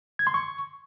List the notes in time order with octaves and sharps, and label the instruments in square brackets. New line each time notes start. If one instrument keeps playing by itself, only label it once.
[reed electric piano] G#6
C6
C#6